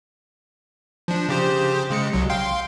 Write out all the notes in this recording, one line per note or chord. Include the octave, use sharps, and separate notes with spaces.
F3 D4
C#3 G4 C5
C#3 G#3 C#7
C2 F#3
F5 G5 C6